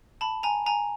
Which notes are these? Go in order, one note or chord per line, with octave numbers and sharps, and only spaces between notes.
A5 B5
G#5 A#5
G#5 A#5